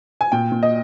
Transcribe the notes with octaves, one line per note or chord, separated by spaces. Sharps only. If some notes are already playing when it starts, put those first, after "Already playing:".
G#5
A#2 G5
A#2
D#5